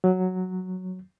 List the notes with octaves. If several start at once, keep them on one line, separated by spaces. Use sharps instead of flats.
F#3